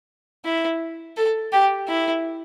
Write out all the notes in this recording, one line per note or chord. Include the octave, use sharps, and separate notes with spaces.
E4
A4
G4
E4